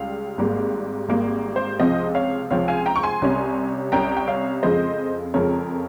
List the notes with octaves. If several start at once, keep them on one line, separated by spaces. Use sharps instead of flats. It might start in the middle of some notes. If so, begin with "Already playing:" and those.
Already playing: C#2 C#3 G3 F5
G#1 G#2 G3 A#3
G#1 G#2 G3 A#3
C5
C#2 C3 F3 C4 C5 D#5
C#5 F5
C#2 C3 F3 C4 C#5 F5
F5 G#5
G5 A#5
C#6
G#5 C6
C2 C3 G3 C#4
C2 C3 G3 C#4 G5 A#5
G5
C#5 F5
F2 C#3 F3 G#3 C5 D#5
F2 C#3 F3 G#3 A#4 C#5